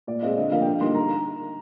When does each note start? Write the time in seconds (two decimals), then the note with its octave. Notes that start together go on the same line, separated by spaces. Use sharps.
0.07 A#2 D5
0.22 G#3 C4 F4 D#5
0.37 D3 D#5
0.52 F3 A#3 D4 F5
0.61 G5
0.67 D3 F5
0.81 G3 A#3 D#4 C6
0.95 A#5